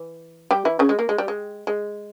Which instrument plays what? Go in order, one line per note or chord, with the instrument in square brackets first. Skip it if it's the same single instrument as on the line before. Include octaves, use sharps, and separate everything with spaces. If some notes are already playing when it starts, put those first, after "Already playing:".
Already playing: [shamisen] E3
G3 G4
E3 E4
C#3 C#4
G#3
A#3
G#3
G3
G#3
G#3